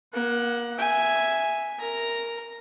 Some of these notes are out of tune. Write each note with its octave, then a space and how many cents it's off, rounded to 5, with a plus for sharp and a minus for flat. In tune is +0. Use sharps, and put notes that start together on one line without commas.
A#3 +30 F#5 +0
E5 +0 G#5 +0
A#4 +0 A#5 +0